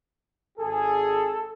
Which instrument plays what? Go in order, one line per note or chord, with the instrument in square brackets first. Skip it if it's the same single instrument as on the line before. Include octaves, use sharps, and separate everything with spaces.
[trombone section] G#1 G#4 [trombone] A4